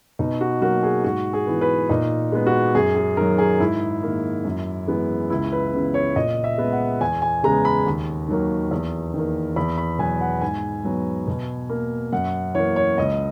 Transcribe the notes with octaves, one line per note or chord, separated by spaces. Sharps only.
B2 D#4
F#4
F#3 A#3 F#4
G#4
G#2 F#4
G#4
E3 B3
B4
A#2 D#4
G#3 B3
F#4
F#2 G#4
G#4
D#3 F#3 A#4
G#4
G#2 E4
D#3 A#3
F#2
E3 G#3 B3
C#2 E4
B4
C#3 E3 B3
C#5
A#2 D#5
E5
G#3 B3
F#5
E2 G#5
G#5
C#3 G#3 B3 A#5
B5
D#2
D#3 F#3 A#3
E2
D#3 A#3
E2 B5
B5
B2 F#3 B3 G#5
F#5
G#2 G#5
F#3 B3
B2
A#3
F#2 F#5
E3 A#3 C#5
C#5
C#2 D#5